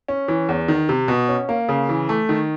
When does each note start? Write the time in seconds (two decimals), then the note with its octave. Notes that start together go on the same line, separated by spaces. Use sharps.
0.08 C#4
0.28 E3
0.49 E2
0.68 D#3
0.89 C3
1.08 B2
1.28 C#4
1.49 A#3
1.69 C#3
1.89 E3
2.09 A3
2.29 D#3